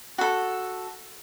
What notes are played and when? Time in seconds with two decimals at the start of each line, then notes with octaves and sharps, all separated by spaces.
0.18 F#4 A4